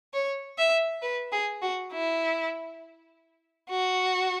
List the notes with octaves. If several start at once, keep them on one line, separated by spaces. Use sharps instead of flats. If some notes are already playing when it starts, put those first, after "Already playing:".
C#5
E5
B4
G#4
F#4
E4
F#4